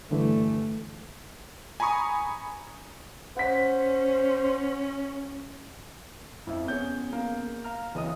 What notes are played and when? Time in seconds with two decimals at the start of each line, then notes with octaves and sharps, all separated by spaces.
0.11 G2 D3 E3 A3
1.80 G#5 A#5 B5 C#6 D#6
3.37 C#4 C5 F#5 B6
6.47 F2 E4 E5
6.68 B3 C#4 G#4 C#5 G6
7.13 A#3
7.65 F5 A#5 F6
7.95 F#1 E3 G#4 D#5 D#6